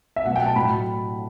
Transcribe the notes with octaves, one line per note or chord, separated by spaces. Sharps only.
E5
B2 F#3 A3 F#5
G5
A5
A2 F#3 A3 B5